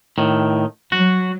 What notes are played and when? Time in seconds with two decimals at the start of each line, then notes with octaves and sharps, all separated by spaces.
0.18 A2 D#3
0.92 F#3 F#4